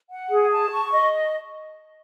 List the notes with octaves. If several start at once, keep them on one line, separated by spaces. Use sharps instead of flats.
F#5
G#4
A5
C#6
D#5